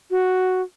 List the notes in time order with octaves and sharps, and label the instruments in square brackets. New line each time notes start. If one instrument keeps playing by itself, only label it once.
[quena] F#4